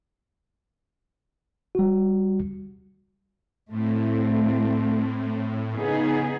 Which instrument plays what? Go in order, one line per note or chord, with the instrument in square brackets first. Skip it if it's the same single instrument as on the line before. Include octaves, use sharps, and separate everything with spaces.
[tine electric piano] G3 F#4
[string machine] A2 [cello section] A3 C4
[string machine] C#3 [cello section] B3 D#4 G#4